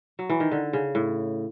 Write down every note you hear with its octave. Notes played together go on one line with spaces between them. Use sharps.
F#3
E3
D#3
D3
C#3
A2